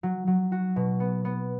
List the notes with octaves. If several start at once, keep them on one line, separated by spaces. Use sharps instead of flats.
F#3
F#3
F#4
B2
B3
B3